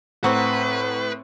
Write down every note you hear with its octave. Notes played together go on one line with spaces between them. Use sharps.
A2 C4 B4 F#5 A#5 C#6